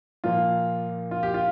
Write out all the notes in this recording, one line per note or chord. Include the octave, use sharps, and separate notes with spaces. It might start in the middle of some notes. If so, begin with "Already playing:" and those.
A#2 F3 A#3 F4
F4
G4
F4